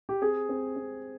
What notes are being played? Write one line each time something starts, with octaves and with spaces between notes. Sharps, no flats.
G4
C4 G#4
C4
C4